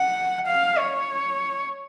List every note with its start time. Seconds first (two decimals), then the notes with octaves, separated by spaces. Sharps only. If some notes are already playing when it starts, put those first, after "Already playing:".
Already playing: F#5
0.47 F5
0.78 C#5